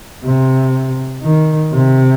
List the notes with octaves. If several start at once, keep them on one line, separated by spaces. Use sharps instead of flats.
C3
D#3
C3